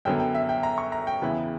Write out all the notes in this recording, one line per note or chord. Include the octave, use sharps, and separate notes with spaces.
F#2 D3 F#3 B3 G5
G5
E5
G5
A#5
C#6
A#5
G5
E2 C#3 E3 B3 E4